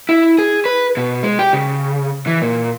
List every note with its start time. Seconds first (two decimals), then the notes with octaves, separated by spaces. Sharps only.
0.09 E4
0.38 G#4
0.65 B4
0.97 B2
1.23 G#3
1.39 G4
1.53 C#3
2.27 E3
2.42 A#2